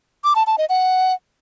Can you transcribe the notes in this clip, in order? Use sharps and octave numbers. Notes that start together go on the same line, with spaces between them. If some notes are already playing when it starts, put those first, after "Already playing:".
D6
A5
A5
D#5
F#5